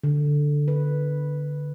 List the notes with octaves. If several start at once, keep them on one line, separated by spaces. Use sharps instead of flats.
D3
B4